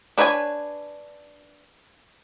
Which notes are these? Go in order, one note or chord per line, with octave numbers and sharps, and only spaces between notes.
D4 B4 C#5 D5 G#5